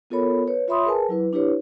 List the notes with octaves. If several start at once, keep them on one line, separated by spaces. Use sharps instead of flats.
B3 F4 A4 A#4 C#5 B5
B4 C#5
F4 C#5 E5 B5 C6 D#6
G#4 A#4 B4 G#5 A5
F#3 E4 B4
D4 E4 G4 B4 C#5